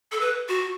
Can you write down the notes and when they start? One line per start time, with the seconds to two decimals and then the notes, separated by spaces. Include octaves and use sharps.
0.12 A4
0.21 B4
0.49 F#4